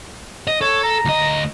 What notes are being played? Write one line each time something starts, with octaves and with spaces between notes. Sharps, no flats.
D#5
A4 C#5
A#5
D2 D#5